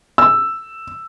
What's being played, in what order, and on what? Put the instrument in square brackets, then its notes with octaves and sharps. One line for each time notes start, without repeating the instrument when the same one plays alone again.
[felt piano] E6